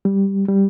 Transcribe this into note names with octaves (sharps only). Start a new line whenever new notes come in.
G3
G3